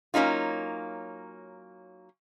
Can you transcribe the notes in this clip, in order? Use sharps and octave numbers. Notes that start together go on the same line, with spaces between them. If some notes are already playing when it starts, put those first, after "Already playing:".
F#3 A#3 C#4 D#4 F4